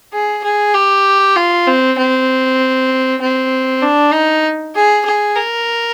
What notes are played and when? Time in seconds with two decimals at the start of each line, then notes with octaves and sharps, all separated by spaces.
0.13 G#4
0.44 G#4
0.74 G4
1.36 F4
1.67 C4
1.98 C4
3.21 C4
3.82 D4
4.13 D#4
4.75 G#4
5.05 G#4
5.35 A#4